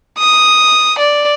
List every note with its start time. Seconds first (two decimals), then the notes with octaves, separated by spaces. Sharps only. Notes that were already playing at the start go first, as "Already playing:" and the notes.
0.18 D#6
0.99 D5